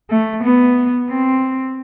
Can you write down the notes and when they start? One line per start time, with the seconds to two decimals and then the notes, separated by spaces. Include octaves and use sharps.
0.10 A3
0.44 B3
1.10 C4